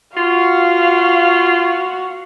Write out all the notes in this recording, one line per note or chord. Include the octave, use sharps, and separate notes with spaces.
F4 F#4 F5